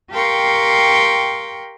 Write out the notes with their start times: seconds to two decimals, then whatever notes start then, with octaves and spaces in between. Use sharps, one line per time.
0.11 G4 A#4 F5 G5 C6 C#6